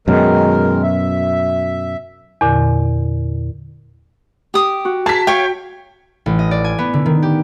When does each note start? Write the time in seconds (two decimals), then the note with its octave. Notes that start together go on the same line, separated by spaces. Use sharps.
0.08 F#2 B2 D#3 G#3 A#4
0.83 E5
2.41 E2 A#2 D3
4.54 G4 D#6
4.85 F#4
5.06 G#4 A#4 A5 B6
5.27 C#5 F5 G5 C#6
6.26 A1
6.39 D#5
6.51 D5
6.64 G#5
6.78 B3
6.94 D3
7.06 D#3
7.23 G4